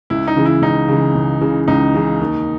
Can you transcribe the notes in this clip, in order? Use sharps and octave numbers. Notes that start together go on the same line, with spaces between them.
C#2 E4
D#4
C#3 E3
E4
C#2 D#4
C#3 E3
C#2
C#3 E3
C#2 D#4
C#3 E3
D#2